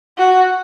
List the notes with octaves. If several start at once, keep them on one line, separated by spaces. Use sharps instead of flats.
F#4